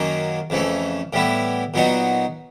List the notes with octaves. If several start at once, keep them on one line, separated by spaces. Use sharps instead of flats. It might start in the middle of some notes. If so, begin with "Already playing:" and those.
Already playing: F#2 D#3 F#3 A#3 C#4
F2 C#3 E3 A3 C#4
A2 E3 G3 B3 E4
A#2 F#3 B3 D#4 F#4